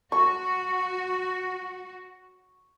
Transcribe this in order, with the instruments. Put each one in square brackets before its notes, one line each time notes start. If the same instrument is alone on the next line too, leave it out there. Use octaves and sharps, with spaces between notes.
[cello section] F#4 [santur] C#6